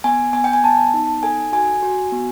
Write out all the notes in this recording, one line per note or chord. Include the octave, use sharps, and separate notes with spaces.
B3 G#5
B3 G#5
G5
G#5
B3 A5
D#4
A4 G#5
F#4 G#5
F#4
B3